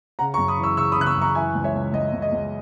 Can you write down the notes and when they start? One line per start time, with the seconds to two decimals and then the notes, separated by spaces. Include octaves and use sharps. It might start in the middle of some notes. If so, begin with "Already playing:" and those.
0.19 C#3 F#5 A#5
0.34 A#5 C#6
0.38 F#2
0.48 B5 D#6
0.58 E3
0.63 C#6 E6
0.77 C#3 C#6 E6
0.92 B5 D#6
0.96 C#3 F#6
1.06 C#6 E6
1.17 F#2 A#5 C#6
1.35 E3 E5 G#5
1.55 C#2
1.64 C#5 E5
1.75 C#2
1.93 C#2 D#5
2.13 C#2
2.22 D#5
2.32 C#2